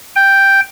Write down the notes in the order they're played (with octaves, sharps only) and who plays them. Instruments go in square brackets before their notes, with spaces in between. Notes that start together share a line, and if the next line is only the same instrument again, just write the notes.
[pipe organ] G5